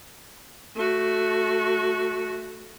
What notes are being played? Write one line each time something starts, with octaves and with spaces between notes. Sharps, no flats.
A3 F#4